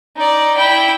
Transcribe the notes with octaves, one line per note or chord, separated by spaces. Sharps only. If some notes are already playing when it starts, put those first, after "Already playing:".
D#4 D5
E4 G5